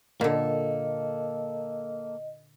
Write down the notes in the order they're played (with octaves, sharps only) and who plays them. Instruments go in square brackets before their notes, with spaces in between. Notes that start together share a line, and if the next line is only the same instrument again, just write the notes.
[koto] A#2 D3 [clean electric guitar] A#3 A4 [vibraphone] D#5